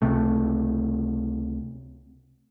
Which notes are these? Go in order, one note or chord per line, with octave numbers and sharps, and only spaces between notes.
C#2 C3 A3